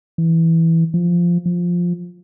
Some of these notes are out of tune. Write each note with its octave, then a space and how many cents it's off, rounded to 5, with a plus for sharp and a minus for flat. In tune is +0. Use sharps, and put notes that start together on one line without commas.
E3 -5
F3 -10
F3 +5